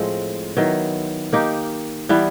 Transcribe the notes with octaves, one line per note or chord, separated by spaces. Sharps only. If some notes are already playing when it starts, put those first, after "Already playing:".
Already playing: A2 F3 G#3 C4
D#3 F#3 B3 E4
A#3 D#4 G4
E3 G3 B3